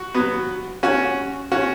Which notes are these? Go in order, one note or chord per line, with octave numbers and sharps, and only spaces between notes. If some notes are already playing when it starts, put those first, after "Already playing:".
Already playing: F#4
F#3 B3
C#4 F#4
C#4 F#4